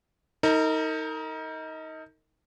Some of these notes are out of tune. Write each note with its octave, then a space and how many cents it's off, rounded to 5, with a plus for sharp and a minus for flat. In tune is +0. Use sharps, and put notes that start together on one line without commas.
D#4 +25 A#4 -35